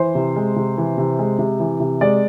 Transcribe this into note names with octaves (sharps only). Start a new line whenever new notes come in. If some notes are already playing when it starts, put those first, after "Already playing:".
Already playing: E3 C5
C3
G#3
C3
E3
C3
G#3
C3
E3
C3
G#3 D5